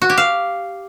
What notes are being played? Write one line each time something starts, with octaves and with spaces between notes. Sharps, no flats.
F#4
G4
F5